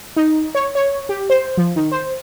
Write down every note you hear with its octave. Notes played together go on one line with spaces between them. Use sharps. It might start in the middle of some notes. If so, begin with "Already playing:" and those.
D#4
C#5
C#5
G4
C5
F3
D#3
C5